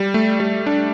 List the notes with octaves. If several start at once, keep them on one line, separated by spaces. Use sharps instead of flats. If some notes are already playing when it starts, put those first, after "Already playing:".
Already playing: G3
A3
G3
D4